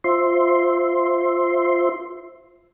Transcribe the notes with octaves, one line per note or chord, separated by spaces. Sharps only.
F4 C5 E5 C6